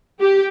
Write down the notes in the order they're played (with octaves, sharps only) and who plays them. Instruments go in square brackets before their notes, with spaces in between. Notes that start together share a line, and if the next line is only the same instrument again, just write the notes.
[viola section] G4